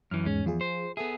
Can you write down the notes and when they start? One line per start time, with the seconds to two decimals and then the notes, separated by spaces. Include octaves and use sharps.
0.11 F#2 E3 F6
0.26 E2 G#2 G#3 C#4
0.46 E2 F3 F4 G#4
0.61 C5
0.97 B3 G#4 A4 E5